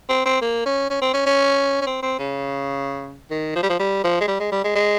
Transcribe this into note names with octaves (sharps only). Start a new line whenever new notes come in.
C4
C4
A#3
C#4
C#4
C4
C#4
C#4
C#4
C4
C4
C#3
D#3
F3
G3
F3
G3
F3
G#3
G3
G#3
G3
G#3
G#3